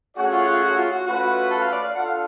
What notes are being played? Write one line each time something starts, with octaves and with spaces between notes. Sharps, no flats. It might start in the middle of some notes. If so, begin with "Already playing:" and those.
A3 C#4 F#4 G#4 C#5 F#5
F4
F4
F#4
F4
F#4
A3 C#4 F4 F#4 B4
A4
F5
D5
F5
D4 F4 A4 F#5
F5